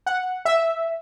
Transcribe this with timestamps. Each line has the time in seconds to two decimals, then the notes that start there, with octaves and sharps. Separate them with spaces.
0.06 F#5
0.45 E5